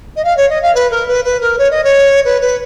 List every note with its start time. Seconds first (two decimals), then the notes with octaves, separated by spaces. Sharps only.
0.16 D#5
0.24 F5
0.37 C#5
0.49 D#5
0.62 F5
0.74 B4
0.91 A#4
1.08 B4
1.24 B4
1.41 A#4
1.58 C#5
1.71 D#5
1.84 C#5
2.24 B4
2.41 B4